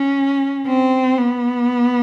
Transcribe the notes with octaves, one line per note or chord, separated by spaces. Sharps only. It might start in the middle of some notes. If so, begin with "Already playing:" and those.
Already playing: C#4
C4
B3